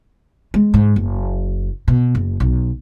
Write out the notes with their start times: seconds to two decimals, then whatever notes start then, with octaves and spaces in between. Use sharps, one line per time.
0.54 G#3
0.74 G#2
0.96 F#1
1.88 B2
2.15 F#1
2.40 B1